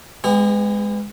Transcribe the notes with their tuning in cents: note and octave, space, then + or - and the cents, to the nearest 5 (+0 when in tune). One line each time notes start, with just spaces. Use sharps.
G#3 +0 B3 +30 G#4 -45